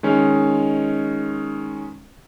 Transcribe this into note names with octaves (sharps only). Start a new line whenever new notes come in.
D#3 G#3 C#4